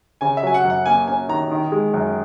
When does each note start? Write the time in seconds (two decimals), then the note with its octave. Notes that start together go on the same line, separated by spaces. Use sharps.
0.21 C#3 G#5
0.37 E5
0.43 F#3 G#5
0.54 F#5
0.64 F#2
0.70 F#5
0.86 A#3 G#5
1.08 C#4 G#5
1.29 D#3 A#5
1.51 D#3
1.72 G#3
1.94 F#2